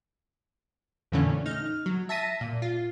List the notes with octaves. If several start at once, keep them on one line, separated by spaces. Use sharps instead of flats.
F2 A#2 D3 E3 A3 C#4
D#4 F6
F#3
E5 A5 A#6 B6 D#7
A#2
F4